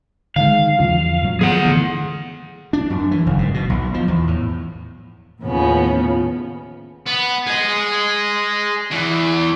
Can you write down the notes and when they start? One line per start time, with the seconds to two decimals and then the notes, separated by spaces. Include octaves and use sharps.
0.36 D3 D#3 G#3 F5
0.79 E2 C#3 F3
1.21 A2 F#3
1.41 D#3 F3 B3 G#4 F#5
1.64 D3 E3 A3
2.73 D4
2.90 F#2
3.11 E3
3.26 F#1
3.38 G#2
3.54 B2
3.70 B1
3.94 F3
4.08 E2
4.27 A2
5.42 D#2 A2 C#3 F3 B3 C#4
7.06 B3
7.47 G#4 D#5
8.91 E2 E3